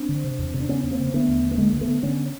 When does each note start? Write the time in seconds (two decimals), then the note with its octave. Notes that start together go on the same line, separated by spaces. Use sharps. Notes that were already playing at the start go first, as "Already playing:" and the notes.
Already playing: C4 D4
0.09 D3
0.24 C3
0.39 E2
0.54 C3
0.60 D4
0.68 C#3 B3 C#4
0.83 E2 C#4
0.91 A#3 C4
0.99 C#3
1.13 D3 A3 B3
1.28 D#2
1.43 D3
1.51 B3
1.58 D3 G#3 A#3
1.73 D2
1.81 A3 B3
1.88 D3
2.02 D3 B3 C#4